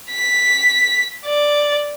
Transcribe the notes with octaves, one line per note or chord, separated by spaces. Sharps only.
B6
D5